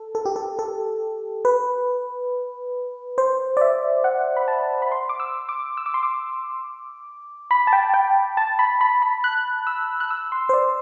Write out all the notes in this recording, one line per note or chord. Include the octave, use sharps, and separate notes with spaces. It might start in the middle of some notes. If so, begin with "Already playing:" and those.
Already playing: A4
A4
G4
A4
A4
B4
C5
D5
E5
F#5
B5
A5
B5
C6
D6
E6
D6
E6
D6
C6
D6
B5
A5
G5
G5
A5
B5
B5
B5
F#6
E6
F#6
E6
C6
C5
D5